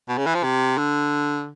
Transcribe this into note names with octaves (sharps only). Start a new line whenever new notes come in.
B2
C#3
E3
F3
C3
D3